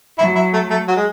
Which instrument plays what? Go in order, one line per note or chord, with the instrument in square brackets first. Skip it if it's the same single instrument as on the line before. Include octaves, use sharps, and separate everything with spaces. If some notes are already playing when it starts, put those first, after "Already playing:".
[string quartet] F#3 [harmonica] E4
[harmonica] E4
A3
A3
F#3
G#3